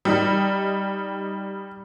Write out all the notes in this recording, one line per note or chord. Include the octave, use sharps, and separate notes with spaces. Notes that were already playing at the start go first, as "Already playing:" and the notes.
G3 D#4